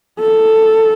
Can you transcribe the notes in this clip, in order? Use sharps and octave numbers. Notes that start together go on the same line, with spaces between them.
A4